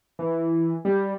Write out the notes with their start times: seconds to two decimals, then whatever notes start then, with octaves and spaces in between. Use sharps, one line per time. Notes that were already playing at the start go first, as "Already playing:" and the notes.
0.19 E3
0.85 G3